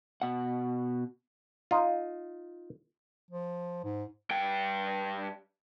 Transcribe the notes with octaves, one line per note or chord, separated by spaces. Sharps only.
B2 F#5
D#4 F4
F3
G#2
G2 G5